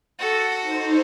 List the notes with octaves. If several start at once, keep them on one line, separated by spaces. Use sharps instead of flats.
F#4 A4
D#4 C5